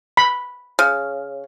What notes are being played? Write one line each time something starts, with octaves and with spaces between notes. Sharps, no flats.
B5
C#3